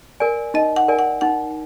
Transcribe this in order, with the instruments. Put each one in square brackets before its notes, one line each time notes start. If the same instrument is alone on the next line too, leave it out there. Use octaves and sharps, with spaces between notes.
[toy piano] A#4 D5 G#5
[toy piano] D#4 [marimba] D#5
[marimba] F#5
[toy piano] A#4 D5 G#5
[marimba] F#5
[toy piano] D#4 [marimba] F#5